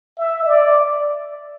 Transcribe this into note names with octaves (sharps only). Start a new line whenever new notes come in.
E5
D5